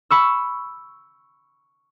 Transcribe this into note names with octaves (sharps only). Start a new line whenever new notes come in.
B5 C#6 E6